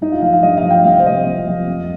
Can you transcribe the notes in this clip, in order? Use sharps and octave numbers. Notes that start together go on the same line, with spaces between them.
G2 D#4
F4
F3 F5
F5
G2 D#5
F5
F3
G5
C2 F5
C5
C3 F3 D#5
C2
C3 F3
F2